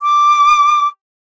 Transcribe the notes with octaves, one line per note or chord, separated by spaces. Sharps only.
D6